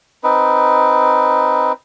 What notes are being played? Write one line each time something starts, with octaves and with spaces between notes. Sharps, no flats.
C4 D#4 B4